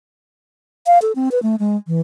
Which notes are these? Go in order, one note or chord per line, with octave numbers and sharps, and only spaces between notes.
F5
A4
C4
B4
A3
G#3
E3